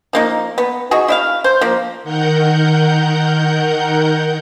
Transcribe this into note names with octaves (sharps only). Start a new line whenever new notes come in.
F3 A#3 D#4
B3
D#4 F#4 G#4
E4 E5 F5
C5
F3 A#3
D#3 A#4 F#5 G6